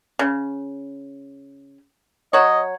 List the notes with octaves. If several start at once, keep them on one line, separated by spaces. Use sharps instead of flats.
C#3
F#3 C#5 D#5